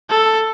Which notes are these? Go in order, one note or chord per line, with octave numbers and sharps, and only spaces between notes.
A4